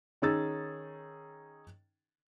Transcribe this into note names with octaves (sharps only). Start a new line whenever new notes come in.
D#3 C#4 D#4 G#4 E6 A6